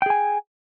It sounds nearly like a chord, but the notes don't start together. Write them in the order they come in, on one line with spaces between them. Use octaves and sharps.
G5 G#4 G#5